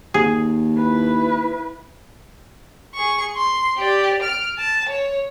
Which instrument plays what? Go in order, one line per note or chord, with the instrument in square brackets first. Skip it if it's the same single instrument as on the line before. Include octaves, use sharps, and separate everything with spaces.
[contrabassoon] D#2 [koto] G#4
[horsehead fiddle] E4 B4
[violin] G#4 C#6
C6
G4 D5
F6 D7
A5
C#5